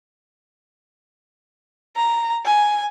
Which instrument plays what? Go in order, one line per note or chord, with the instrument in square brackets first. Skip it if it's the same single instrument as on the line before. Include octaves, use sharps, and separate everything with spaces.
[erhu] A#5
G#5